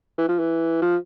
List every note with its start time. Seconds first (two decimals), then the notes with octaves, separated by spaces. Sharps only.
0.18 E3
0.28 F3
0.39 E3
0.82 F3